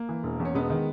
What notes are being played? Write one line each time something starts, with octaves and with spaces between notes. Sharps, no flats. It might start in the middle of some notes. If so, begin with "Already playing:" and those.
Already playing: A#3
E3
E1
E2
C#4
E1 G#3 B3
D#3